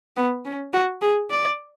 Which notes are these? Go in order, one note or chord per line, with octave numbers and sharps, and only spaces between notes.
B3
C#4
F#4
G#4
D5